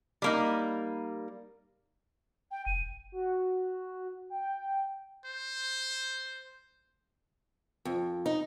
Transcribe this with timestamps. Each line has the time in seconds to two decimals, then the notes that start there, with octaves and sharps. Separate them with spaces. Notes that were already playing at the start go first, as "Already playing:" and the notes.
0.22 G3 A#3 D#4
2.51 G5
2.66 F1 D#7
3.12 F#4
4.30 G5
5.25 C5
7.85 F2
8.26 D#4